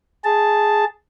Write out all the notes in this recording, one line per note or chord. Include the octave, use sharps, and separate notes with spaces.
G#4 A5